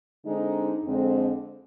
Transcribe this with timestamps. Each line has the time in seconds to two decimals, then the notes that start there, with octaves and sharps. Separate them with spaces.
0.25 D3 G#3 C4 D#4
0.85 F2 D3 G#3 C4